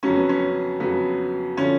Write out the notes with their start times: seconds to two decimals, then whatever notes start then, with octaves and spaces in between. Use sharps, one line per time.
0.03 F2 C#3 F#3 C#4
0.16 B3
0.29 C#4
0.80 F2 C#3 F#3 B3
1.57 D3 F3 C#4